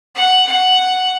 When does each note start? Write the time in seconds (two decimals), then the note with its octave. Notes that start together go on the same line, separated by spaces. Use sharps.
0.15 F#5
0.47 F#5